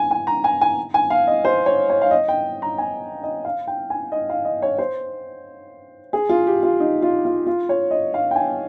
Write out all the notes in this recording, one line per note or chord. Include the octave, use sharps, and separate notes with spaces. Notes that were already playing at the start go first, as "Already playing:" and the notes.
Already playing: G#5
G#5
A#5
G#5
G#5
G#5
F5
D#5
C5
C#5
C#5
F5
D#5
G5
A#5
G#5
D#5
F5
G5
G#5
D#5
F5
D#5
C#5
C5
G#4
F4
G4
F4
D#4
F4
F4
F4
C#5
D#5
F5
G5
G#5